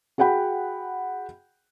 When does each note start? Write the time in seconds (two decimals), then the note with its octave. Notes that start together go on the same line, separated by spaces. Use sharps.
0.18 F#4 G#4 F#5 G5 B5